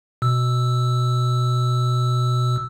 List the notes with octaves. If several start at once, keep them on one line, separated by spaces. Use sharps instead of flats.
B2 E6